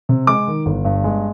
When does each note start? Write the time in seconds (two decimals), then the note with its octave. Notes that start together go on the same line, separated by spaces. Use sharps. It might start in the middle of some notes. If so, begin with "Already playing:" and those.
0.09 C3
0.27 G#3 D6
0.47 D#3
0.66 G1
0.85 G2
1.04 G#3